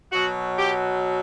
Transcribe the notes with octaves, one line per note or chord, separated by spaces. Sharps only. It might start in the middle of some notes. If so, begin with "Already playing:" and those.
B2 F#3 F#4
G4